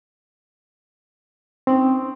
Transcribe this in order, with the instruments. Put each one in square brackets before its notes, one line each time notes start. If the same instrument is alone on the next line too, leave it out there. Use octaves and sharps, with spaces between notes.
[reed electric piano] C4 [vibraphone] C#4 D#4